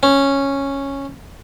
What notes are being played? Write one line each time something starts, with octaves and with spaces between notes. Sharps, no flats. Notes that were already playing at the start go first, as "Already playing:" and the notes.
C#4